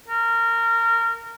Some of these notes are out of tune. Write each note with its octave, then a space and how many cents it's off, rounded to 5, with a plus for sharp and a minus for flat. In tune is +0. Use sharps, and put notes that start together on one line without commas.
A#4 -20